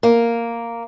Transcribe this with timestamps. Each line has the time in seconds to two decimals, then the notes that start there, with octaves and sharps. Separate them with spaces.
0.03 A#3